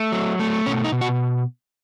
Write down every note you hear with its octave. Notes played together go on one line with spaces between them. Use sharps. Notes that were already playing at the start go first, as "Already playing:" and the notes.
Already playing: A3
F#3
A3
B2 C#4
D#4
B2
F#4